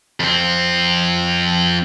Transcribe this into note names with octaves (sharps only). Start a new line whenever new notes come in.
F2 C4